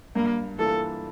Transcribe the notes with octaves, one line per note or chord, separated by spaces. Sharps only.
G2 A#3
E3 A#3 D4 F4 A4